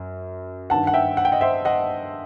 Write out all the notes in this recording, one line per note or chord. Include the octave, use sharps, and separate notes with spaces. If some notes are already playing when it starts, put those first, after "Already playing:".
Already playing: F#2
G2 D#3 F#5 A5
F#5
E5 G5
F#5
G5
D#5 F#5
C5 E5
D#5 F#5